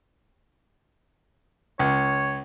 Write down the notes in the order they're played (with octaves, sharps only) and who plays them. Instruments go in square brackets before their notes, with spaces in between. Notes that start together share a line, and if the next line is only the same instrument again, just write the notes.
[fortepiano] C#2 [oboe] C#5